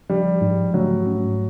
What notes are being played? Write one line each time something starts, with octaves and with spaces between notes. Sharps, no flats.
F3 G3
G#2
F#3 A3
C#4